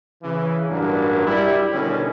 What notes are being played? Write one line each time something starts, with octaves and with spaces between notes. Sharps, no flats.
C#3 E3
A1 G2 F#3 A#3 D4 A#4
G3 E4
B2 D3 D#3 C#4